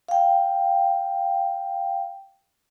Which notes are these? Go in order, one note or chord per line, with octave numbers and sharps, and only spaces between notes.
F5 G5